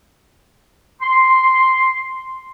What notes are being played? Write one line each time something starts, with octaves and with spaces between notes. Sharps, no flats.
C6